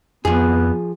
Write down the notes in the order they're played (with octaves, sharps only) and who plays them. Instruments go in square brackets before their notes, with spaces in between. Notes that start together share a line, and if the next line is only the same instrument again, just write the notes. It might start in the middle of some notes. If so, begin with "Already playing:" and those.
[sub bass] F2 [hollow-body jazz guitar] F3 G#4 [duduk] B3